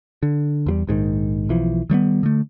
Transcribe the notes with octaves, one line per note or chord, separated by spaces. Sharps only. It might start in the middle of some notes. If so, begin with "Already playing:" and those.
D3
E2 F#3 G3
A#1 G#2 B2 D#3
B1 E3 F3
D#3 G3 A3 B3
D3 A3